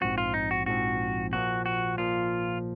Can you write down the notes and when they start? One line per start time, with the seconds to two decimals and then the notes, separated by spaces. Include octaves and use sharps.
0.01 A#1 G#2 F3 C4 F#4
0.18 F4
0.34 D#4
0.51 F#4
0.66 A#1 G#2 F3 C4 F#4
1.33 A#2 F3 A#3 F#4
1.66 F#4
1.98 A#2 F3 A#3 F4